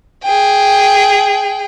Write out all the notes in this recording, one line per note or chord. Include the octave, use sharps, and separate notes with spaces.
G#4 G5